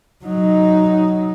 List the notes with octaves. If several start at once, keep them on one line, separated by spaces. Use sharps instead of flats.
F#3 D#4